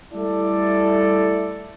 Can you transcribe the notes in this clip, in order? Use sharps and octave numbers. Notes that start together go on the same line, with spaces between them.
G3 A3 E4 A4 D5